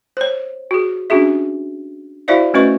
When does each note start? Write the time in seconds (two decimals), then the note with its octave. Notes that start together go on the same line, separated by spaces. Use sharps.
0.17 C5 C#5
0.71 F#4 G#4
1.10 C#4 D4 F#4 G#4 E5
2.28 E4 F#4 C5 D5 E5 F5
2.54 A3 C#4 F#4 B4 D#5 C#6